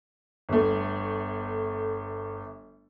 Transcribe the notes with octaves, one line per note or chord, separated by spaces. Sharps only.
G1 A3